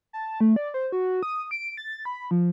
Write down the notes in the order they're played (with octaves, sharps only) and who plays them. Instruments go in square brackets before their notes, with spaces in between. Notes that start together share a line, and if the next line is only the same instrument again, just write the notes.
[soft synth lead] A5
A3
D5
C5
F#4
D#6
D7
A6
B5
F3